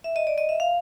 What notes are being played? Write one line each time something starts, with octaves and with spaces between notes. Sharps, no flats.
E5
D#5
D5
D#5
E5
F5